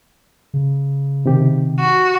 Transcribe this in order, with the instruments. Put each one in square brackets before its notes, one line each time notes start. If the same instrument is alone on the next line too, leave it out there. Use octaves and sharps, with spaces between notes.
[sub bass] C#3
[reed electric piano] C3 D#3 G4
[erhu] F#4